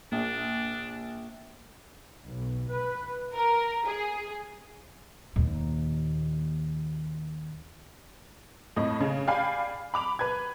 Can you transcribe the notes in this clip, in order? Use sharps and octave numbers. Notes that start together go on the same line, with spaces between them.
A#1 A#3 D4
B1
B4
A#4
G#4
D#2 A#2
F2 A2 D#5
C#3
D5 F5 G5 G#5 B5
B5 D6 F7
B4 G#6